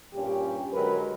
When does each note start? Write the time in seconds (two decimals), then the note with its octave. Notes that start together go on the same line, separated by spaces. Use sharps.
0.14 G2 A#2 C#4 G4
0.73 D3 F#3 G#3 A#4 B4